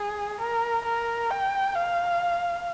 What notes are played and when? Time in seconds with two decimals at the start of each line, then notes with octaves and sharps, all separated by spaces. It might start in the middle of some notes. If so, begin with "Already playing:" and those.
Already playing: G#4
0.40 A#4
0.85 A#4
1.31 G5
1.75 F5